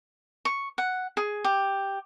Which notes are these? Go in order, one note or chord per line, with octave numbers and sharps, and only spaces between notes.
C#6
F#5
G#4
G4